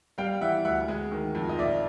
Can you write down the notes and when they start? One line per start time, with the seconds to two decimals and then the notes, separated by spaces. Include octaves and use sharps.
0.18 G3 F5 G5
0.41 E3 E5 F#5
0.65 D2 E5 F#5
0.88 G#3
1.12 D#3
1.35 F2
1.49 D#5
1.58 A#1 D5 E5